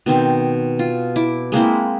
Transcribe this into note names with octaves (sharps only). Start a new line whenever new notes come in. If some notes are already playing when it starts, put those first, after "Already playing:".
B2 D#3 C4
F4
E4 D6
G#3 A#3 C4 E4